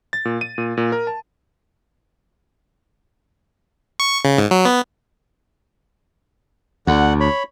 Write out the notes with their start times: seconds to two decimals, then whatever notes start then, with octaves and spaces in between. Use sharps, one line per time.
0.13 A6
0.25 A#2
0.41 D#7
0.58 A#2
0.77 A#2
0.92 A#4
1.07 A5
4.00 C#6
4.25 C#3
4.38 G#2
4.51 F#3
4.65 B3
6.87 D2 D3 F#5
7.20 C#5 B5